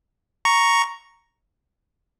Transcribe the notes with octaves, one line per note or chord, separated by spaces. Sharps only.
A#5 C#6